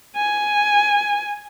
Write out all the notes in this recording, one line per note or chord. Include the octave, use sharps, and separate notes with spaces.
G#5